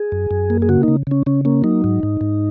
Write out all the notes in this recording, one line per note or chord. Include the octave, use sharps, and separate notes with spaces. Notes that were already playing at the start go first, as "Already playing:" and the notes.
Already playing: G#4
F#2
F#2
A#3
G#4
C#3 F#4
C#3 D#4
C#3 C#4
C#3 C#4
A#3 C#4
F#3 D#4
G#2
G#2
G#2